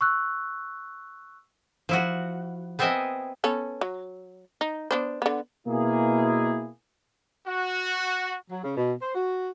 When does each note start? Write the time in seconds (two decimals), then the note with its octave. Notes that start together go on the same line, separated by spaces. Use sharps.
0.01 C#6 E6 F#6
1.89 F3 E4 F#4
2.79 B3 C4 A#4 D#5 E5 G#5
3.44 B3 C#4 A4
3.81 F#3
4.61 D#4
4.91 B3 D4 C5
5.22 D3 B3
5.67 B2 A#3 E4 G#4
7.47 F#4
8.51 F#3
8.63 C#3
8.77 B2
9.02 C5
9.15 F#4